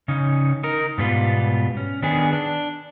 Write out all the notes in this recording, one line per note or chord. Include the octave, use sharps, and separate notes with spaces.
C#3 C#4 D#4
D#4 A#4
G#2 B2 G3 B3 F4
C#4
D#3 B3 D4 G#4
D4